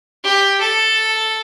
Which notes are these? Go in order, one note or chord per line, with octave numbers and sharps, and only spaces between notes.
G4
A4